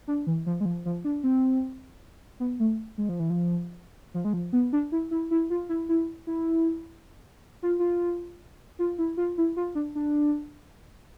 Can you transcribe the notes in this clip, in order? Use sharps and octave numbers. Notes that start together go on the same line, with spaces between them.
D4
E3
F3
G#3
F3
F3
D4
C4
B3
A3
G#3
F3
E3
F3
F3
G#3
F3
B3
D4
E4
E4
E4
F4
E4
E4
E4
F4
F4
F4
E4
F4
E4
F4
D4
D4